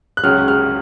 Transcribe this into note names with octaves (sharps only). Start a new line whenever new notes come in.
F#6
C#2 C#3 F#3 F6
F6